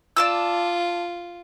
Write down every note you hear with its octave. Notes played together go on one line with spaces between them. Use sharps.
F4 D5 A5 E6